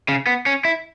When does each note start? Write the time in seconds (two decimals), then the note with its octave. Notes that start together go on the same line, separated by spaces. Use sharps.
0.09 C#3
0.27 B3
0.46 C#4
0.65 E4